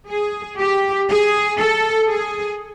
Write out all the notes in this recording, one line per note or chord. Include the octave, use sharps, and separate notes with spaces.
G#4
G4
G#4
A4
G#4